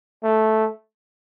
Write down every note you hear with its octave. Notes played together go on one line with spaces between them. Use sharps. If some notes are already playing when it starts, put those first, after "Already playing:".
A3